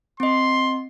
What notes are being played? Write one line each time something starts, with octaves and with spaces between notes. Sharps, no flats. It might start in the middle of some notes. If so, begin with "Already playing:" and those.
C4 D#5 C6